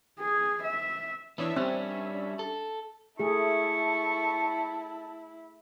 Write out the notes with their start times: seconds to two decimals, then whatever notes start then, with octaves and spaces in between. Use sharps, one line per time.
0.19 G#4
0.63 E5
1.38 E3 B3 D4 C#5 E5
1.56 G3 C4 C#4
2.39 A4
3.20 A3 E4 G#4 A5 C#6